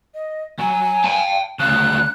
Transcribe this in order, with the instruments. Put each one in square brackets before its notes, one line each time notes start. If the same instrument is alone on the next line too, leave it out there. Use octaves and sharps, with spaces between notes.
[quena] D#5
[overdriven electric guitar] F#3 [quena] G#5
[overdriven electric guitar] G5 A5
[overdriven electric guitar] D2 C#3 [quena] F#6